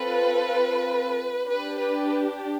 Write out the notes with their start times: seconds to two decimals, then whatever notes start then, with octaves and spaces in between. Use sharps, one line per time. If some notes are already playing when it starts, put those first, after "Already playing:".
Already playing: C4 F4 A4 B4
1.47 D4 G4 B4
1.79 B4